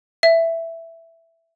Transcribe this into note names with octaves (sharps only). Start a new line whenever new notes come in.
E5